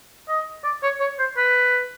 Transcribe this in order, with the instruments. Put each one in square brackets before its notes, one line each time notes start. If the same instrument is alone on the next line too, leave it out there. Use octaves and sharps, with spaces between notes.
[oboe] D#5
D5
C#5
C#5
C5
B4